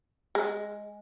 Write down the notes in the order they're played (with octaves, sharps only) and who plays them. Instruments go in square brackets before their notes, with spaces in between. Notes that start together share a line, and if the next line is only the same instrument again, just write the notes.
[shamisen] G#3